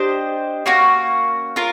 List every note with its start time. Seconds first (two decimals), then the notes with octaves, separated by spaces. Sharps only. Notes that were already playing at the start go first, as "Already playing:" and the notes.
Already playing: D4 G4 C5 D#5
0.66 A#3 C#4 F#4
1.56 F4 A#4